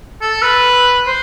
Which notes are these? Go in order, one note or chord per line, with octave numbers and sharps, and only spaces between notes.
A4
B4
C5